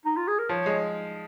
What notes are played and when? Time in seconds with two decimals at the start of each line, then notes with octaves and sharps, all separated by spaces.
0.05 D#4
0.17 F4
0.28 G#4
0.39 A#4
0.49 F3 C#5
0.66 G#3